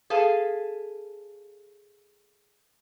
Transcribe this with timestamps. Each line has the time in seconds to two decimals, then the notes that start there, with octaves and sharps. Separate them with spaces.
0.10 G#4 A4 B4 F5